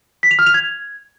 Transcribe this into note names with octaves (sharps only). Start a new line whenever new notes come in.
B6
F7
F6
F7
G#6